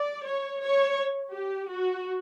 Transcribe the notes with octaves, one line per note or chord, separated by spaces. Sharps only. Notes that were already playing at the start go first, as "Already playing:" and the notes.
Already playing: D5
C#5
C#5
G4
F#4